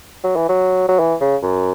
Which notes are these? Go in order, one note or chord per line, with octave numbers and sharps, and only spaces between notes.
F#3
E3
F#3
F#3
E3
C#3
F#2